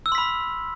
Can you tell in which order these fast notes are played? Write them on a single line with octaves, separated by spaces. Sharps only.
E6 F6 C6 B6 B5